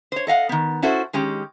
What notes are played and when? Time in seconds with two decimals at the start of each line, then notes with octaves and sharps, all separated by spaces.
0.12 C5 C#5
0.27 A4 D#5 F5 F#5
0.49 D#3 B3
0.82 C#4 E4 F#4 A4 C5
1.13 D#3 G#3 C#4 G4